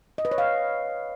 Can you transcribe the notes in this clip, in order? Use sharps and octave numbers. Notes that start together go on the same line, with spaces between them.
D#5
B4
C#5
F5